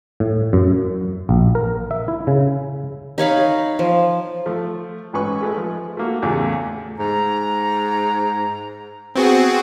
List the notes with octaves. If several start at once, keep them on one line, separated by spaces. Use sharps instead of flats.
A2
F#2
A#1
A#4
E5
E4
C#3
D#4 C#5 F5 B5
F3
F3 A3
A1 G#2 C#4 B4 C#6
G#3 A3 B4
F3
A3 A#3 F#4
E2 A2 C#3 E3 A3 G4
G#2 A#5
B3 C4 F#4 G#4